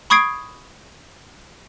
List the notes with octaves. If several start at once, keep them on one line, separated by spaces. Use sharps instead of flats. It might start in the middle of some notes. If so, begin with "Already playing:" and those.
B5 C#6 D#6 G#6 C7 D7